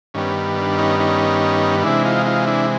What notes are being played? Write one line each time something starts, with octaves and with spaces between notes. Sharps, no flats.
G2 D#3 G3 B3 C#4
D4
C#4 D#4
C#4 D#4
C3 E3 G#3 D4 E4
D#4 F4
D#4 F4
D4 E4